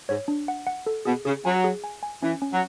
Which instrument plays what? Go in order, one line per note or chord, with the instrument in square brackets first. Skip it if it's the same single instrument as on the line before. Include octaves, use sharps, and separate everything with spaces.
[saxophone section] G#2 [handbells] C#5
[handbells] D4
F#5
F#5
A4
[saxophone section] B2 [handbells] G#4
[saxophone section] C#3 [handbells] G#4
[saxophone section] F#3 [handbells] G#5
[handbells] G#4
G#5
G#5
[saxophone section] E3 [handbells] C#4
[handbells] C#4
[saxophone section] F#3